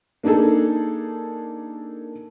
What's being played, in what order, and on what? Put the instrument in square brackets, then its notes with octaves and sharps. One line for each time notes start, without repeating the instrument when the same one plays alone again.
[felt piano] A#3 D4 D#4 G#4 A4